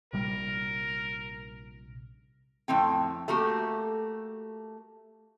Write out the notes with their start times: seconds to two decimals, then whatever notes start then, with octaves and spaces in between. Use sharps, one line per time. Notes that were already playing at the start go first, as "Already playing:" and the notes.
0.13 A#1 C3 G3 A#4
2.68 F2 A2 C4 G5
3.28 A3 A#3 F#4 G4